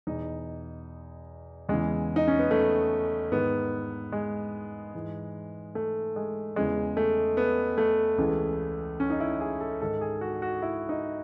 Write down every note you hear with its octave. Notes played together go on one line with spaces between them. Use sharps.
E2 B2 D#4
E2 C#3 E3 G#3
D#4
C#4
B3
A3
G#2 D#3 B3
G#3
G#2 E3
A3
G#3
E2 C#3 E3 G#3
A3
B3
A3
C#2 C#3 E3
C#4
D#4
E4
G#4
A4
G#2 D#3 A4
G#4
F#4
F#4
E4
D#4